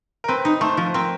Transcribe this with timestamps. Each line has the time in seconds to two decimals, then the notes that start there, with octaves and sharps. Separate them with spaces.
0.24 A#4
0.28 C4 B4
0.45 D#4
0.61 A3 C5
0.77 F3
0.94 C4 A#4